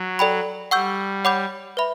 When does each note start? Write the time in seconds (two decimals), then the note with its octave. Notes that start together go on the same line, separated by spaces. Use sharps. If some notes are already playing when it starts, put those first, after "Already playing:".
Already playing: F#3
0.19 A4 D5 G5 B5
0.71 G3 F#5 C#6 E6 G6
1.25 C#5 F#5 B5 D6 G6
1.77 B4 E5 B5